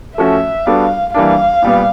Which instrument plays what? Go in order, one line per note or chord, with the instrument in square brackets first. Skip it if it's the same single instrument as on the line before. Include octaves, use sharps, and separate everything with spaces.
[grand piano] F3 A3 C#4 F#4 [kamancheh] E5
[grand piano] G3 B3 D4 F#4 A4 [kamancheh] F5
[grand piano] E3 G3 A#3 D4 [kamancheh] F5
[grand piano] A#2 G3 B3